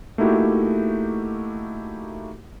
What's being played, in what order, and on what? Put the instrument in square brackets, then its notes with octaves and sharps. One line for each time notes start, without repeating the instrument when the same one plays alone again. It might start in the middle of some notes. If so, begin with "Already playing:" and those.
[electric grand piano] A3 A#3 D#4 E4 F#4 G4